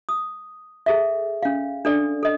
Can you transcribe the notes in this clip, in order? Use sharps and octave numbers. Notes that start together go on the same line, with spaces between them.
D#6
G#4 A4 E5
C#4 F5
D4 A4 D5
A4 D#5